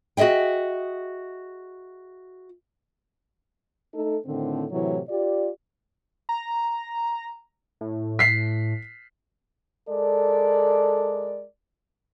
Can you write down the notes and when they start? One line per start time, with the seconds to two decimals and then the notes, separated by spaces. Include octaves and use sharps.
0.17 F#4 G#4 D#5 E5 G5
3.94 A3 D#4 A4
4.27 A2 D3 D#3 C4
4.71 A2 C3 E3 F#3 C#5
5.09 F4 G4 D5
6.29 A#5
7.81 A2
8.19 B6 C7
9.89 G#3 A4 A#4 D5